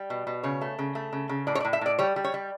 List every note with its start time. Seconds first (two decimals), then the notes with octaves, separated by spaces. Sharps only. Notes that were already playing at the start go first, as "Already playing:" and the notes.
Already playing: G3
0.10 B2
0.27 B2
0.43 C#3 C#5
0.61 A3
0.79 C#3
0.95 A3
1.13 C#3
1.29 C#3
1.47 A2 D5
1.55 C#5
1.60 D5
1.65 A2
1.73 E5
1.81 A2 D5
1.99 G3 C#5
2.16 G3
2.24 C#5
2.34 G3